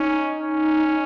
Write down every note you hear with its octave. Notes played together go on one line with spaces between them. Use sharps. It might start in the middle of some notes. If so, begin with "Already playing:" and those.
Already playing: C#4 D#4
C#4